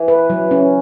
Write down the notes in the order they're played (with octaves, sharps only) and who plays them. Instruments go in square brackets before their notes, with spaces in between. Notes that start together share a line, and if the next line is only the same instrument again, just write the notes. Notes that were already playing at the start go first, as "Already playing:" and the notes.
Already playing: [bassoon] E3
[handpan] B4
F#3
C#4